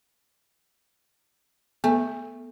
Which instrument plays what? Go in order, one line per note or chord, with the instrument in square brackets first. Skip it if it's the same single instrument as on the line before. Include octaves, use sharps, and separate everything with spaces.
[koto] A3 [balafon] B3